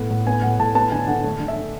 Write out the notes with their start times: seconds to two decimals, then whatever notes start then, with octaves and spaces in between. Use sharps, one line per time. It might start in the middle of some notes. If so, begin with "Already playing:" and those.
Already playing: A2 B3 F#5
0.10 A2
0.27 B3 G#5
0.42 A2 F#5
0.59 A2 A5
0.75 B3 A5
0.92 D3 G#5
1.07 D3 F#5
1.24 A3
1.40 D3
1.48 E5
1.56 D3